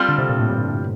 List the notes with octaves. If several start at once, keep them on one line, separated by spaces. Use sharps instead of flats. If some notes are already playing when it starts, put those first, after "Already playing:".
Already playing: G3 C4 F4 A4
D3
C3
A#2
A2
G2